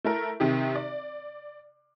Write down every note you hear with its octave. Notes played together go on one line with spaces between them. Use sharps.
A3 E4 A#4
C3 D#3 G4
D5